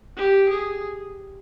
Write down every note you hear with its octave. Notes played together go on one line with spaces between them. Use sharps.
G4
G#4